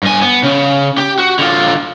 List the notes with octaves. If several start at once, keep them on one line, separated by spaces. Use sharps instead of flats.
G2 G#5
B3
C#3
G4
F#4
D3 F4